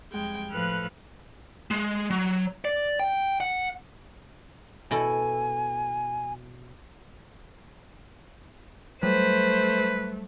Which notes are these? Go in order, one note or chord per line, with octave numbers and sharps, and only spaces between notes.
F2 G3 G#3 G5 G#6
A2 F3 A4 B4 F6 F#6
G#3
F#3
D5
G5
F#5
B2 E4 A4 G#5
F#3 G3 A3 B4 C5